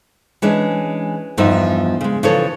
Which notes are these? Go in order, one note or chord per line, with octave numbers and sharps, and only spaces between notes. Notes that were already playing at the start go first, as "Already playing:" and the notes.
E3 G#3 C#4 D4
E2 G2 F3 D#4 E5
C#3 G#3
C#3 E3 F3 A4 C#5